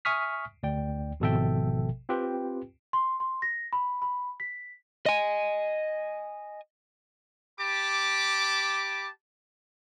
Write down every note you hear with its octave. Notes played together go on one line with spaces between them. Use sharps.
E5 G#5 C#6 D#6 F6 B6
D2 D5 G5
G#1 B2 F3 A4 E5 G5
C4 F4 G4 B4 G5
C6
C6
A#6
B5
B5
B6
D#5 G#5
G4 A5 B5 D6